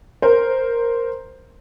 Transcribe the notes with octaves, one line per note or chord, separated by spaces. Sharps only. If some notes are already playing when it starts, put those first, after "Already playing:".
A#4 C5